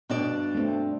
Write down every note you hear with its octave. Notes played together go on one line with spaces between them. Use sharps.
G2 B2 D4 D5
A3 C4